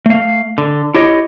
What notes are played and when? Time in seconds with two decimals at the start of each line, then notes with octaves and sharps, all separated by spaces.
0.06 A3 F5
0.58 D3
0.95 E4 G4 C#5 D#5